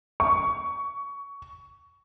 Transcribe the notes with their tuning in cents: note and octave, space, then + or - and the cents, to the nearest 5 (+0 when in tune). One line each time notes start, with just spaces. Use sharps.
C#6 +20